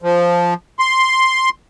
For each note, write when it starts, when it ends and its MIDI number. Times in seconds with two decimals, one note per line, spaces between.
0.02 0.54 53
0.79 1.50 84